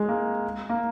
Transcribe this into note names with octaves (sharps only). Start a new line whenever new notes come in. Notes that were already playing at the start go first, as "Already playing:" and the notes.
Already playing: G#3
A#3
A#3